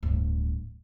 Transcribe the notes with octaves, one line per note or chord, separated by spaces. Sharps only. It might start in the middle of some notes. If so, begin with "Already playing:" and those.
D1 G2